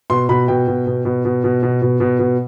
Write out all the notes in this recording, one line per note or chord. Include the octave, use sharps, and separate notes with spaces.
B2 C6
B2 B5
B2 G5
B2
B2
B2
B2
B2
B2
B2
B2
B2